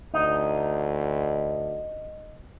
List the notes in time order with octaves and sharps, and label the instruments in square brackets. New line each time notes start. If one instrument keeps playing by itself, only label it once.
[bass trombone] D2 [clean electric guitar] D#4